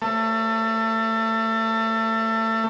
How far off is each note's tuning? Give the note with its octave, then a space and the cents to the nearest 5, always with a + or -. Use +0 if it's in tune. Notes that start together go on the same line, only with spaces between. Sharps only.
A3 +30 A5 +25